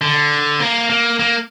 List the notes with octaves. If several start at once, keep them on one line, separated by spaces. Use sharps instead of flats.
D3
A#3
A#3
A#3